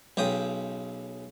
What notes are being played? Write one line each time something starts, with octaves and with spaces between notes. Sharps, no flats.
B1 C#3 G5 D#6